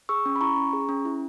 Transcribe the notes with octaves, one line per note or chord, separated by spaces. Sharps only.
G#4 C#6 E6
C#4
B5
E4 A#5 C#6
C#4
G#4
C#4
E4